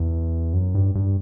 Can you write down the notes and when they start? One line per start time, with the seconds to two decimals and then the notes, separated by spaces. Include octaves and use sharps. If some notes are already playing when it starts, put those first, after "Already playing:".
Already playing: E2
0.53 F#2
0.75 G2
0.95 G2